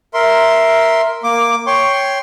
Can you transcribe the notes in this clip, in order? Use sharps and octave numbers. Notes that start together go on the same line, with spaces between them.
A#4 E5 C6
A#3 D6
C#5 G5 C6 C#6